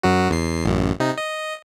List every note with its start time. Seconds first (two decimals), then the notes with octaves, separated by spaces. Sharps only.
0.03 F#2 F#3 F#4
0.30 E2 C7
0.65 A1 F#2
1.00 C3 D#4
1.18 D#5